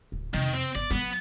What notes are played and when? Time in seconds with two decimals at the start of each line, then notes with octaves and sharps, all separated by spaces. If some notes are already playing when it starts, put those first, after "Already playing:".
0.12 D1
0.34 F2 C3 D#3
0.54 C4
0.75 G1 D5
0.91 F3 F#3 B3